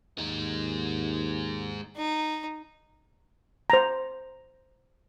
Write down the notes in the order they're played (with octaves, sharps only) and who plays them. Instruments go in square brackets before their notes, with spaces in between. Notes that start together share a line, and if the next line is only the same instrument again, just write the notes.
[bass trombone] D#2 [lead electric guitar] G#3 D#4
[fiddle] D#4
[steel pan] C5 A#5